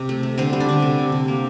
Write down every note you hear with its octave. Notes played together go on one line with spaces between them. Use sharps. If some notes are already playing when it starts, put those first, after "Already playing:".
Already playing: C3
A3
A3
D3 C4 C5
G3
D4 D5
D3
C3
C3
C3
A#3